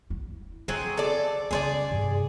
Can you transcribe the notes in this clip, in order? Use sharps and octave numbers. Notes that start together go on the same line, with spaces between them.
E4
D3 F#3 C4 G#4
A4 D5
C#3 C#4 G#4 C5 D5
G2 C3